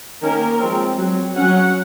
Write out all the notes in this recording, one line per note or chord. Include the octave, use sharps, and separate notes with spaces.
D#3 A#3 C#4 A#4
F3 G#3 C4
F#3 C4
F#3 C#4 F#5